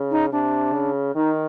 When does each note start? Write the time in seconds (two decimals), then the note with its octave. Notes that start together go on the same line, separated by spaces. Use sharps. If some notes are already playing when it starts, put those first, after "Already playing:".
Already playing: C#3
0.11 D#4
0.32 C3 D4
0.73 C#3
1.16 D#3 D#4